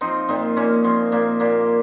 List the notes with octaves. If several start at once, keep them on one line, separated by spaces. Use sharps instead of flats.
F3 C4 D#4
A#2 C4 D#4
A#2 A#3 C#4
F3 C4
A#2 A#3
A#2 A#3